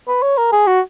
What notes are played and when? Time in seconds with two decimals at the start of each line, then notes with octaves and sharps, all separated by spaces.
0.08 B4
0.22 C#5
0.38 A#4
0.53 G#4
0.67 F#4